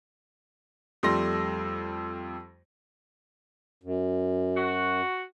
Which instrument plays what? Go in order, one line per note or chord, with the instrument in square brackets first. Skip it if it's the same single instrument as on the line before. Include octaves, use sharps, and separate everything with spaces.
[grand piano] F2 G3 A3 C6 A#6
[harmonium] F#2
[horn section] F#4